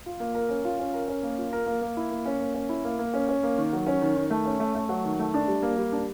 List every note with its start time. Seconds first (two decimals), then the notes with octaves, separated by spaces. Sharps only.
0.06 F4
0.20 A#3
0.35 A#4
0.49 C#4
0.65 F4
0.79 C#4
0.94 A#4
1.08 C#4
1.23 A#3
1.38 F4
1.53 A#4
1.66 A#3
1.82 A#3
1.97 E4
2.11 A#3
2.26 C#4
2.40 A#3
2.54 C#4
2.69 E4
2.84 A#3
2.99 A#3
3.14 C#4
3.29 C#4
3.43 A#3
3.58 D#3
3.73 F#3
3.87 C#4
4.01 D#3
4.16 D#3
4.30 A3
4.45 C#4
4.60 A3
4.75 A3
4.89 F#3
5.05 D#3
5.19 A3
5.34 D4
5.48 G3
5.63 A#3
5.77 G3
5.92 D4